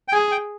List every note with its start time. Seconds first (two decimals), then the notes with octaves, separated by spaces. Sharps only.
0.08 G5
0.12 G#4 G#5
0.31 G5